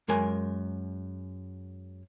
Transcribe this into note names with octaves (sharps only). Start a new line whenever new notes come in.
F#2 G#3 A#4 G#5